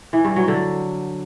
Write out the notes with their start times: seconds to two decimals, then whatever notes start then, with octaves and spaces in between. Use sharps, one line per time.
0.13 E3
0.25 G2
0.36 F#3
0.48 D3